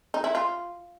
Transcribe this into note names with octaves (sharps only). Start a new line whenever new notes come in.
D#4
E4
F4